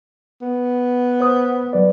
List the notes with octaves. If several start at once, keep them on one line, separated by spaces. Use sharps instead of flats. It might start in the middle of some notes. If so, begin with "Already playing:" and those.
B3
C5 D#6
F#3 B4 D5